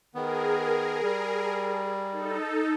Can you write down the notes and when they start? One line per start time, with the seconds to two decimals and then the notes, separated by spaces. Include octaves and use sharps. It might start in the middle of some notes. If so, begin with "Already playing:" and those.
0.15 D#3 B3 G#4 A#4
1.03 G3
2.12 D#4 A4